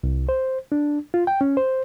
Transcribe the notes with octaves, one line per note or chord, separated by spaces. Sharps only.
C2
C5
D4
F4
G5
C#4
C5